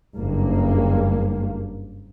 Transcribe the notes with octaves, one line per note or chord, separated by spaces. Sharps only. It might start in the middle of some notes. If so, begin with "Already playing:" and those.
F#1 G2 A#3